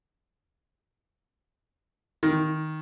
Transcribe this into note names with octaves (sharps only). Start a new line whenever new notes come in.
D#3